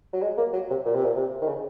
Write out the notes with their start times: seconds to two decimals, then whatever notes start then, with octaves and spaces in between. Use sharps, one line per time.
0.13 F#3
0.22 G#3
0.37 A#3
0.53 F#3
0.70 C3
0.85 A#2
0.95 C3
1.05 A#2
1.16 C3
1.41 D#3
1.47 C#3